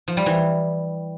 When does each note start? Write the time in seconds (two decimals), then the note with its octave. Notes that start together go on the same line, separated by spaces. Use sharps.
0.08 F3
0.17 G3
0.26 E3